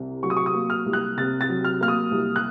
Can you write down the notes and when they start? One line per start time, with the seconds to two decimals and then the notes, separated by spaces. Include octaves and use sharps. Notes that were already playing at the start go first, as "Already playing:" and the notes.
Already playing: C2 C3
0.23 F#3 C#6
0.30 D#6
0.37 C#6
0.46 D#6
0.54 A#3
0.70 F6
0.86 C2
0.93 F#6
1.17 C3 A6
1.41 A6
1.49 F#3
1.64 F6
1.81 A#3 F6
1.88 D#6
2.11 C2
2.36 F#6